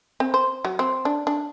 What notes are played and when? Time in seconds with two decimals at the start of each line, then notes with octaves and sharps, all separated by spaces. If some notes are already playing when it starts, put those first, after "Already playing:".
0.20 C4
0.34 C5
0.65 F#3
0.79 C4
1.05 D4
1.27 D4